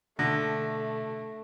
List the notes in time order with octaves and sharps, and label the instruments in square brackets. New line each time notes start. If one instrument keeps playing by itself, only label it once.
[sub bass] B2 [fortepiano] D3 [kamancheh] A3 [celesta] A#6